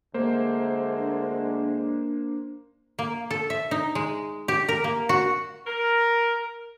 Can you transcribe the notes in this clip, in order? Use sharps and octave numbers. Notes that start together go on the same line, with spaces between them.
D2 G#3 A#3 C5
D4
A#3
A4
E5
D#4
G#3
G4
A#4
A#3
F#4
A#4